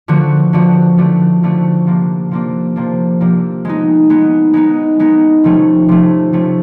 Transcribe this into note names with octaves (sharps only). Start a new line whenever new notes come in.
D3 F3 A3 D4 F#4
D3 F3 A3 D4 F#4
D3 F3 A3 D4 F#4
D3 F3 A3 D4 F#4
C3 F3 A#3 D4
C3 F3 A#3 D4
C3 F3 A#3 D4
C3 F3 A#3 D4
G#3 B3 D#4
G#3 B3 D#4
G#3 B3 D#4
G#3 B3 D#4
C3 F3 A3 C#4
C3 F3 A3 C#4
C3 F3 A3 C#4